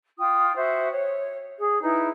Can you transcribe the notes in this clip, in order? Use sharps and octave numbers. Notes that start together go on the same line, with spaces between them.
F4 G5 D#6
F#4 C5 E5
C#5
G#4
D#4 E4 B4